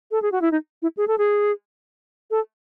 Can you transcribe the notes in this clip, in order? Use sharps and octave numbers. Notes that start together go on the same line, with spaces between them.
A4
G#4
F#4
E4
D#4
E4
G#4
A4
G#4
A4